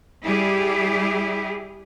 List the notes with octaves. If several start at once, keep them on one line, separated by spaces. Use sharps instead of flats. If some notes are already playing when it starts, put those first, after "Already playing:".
G3 E4 G4 G#4